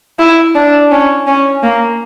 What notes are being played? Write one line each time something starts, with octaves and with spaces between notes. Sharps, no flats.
E4
D4
C#4
C#4
A#3